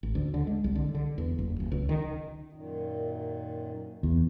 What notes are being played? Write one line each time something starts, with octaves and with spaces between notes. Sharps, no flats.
A1
D2
D3
G#3
C2
D3
D3
E2
F#1
D#1
C#2
D#3
F#2 A#2 D#3
E2